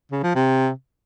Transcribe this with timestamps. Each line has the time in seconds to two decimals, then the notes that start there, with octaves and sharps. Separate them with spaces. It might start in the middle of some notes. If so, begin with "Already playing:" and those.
0.12 C#3
0.24 F3
0.35 C3